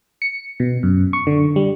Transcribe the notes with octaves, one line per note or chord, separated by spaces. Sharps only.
C#7
B2
F#2
C#6
D3
G3